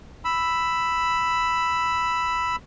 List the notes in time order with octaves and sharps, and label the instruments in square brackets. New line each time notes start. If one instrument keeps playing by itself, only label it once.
[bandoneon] B5 E6